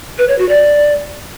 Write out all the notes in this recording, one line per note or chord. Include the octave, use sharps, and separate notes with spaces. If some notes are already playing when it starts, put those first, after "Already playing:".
B4
C#5
F#4
D5